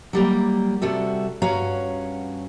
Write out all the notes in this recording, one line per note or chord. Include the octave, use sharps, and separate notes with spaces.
F#3 G3 A#3
C3 G3 F#4 A4
G2 C#4 F#4 C#5 F5 A#5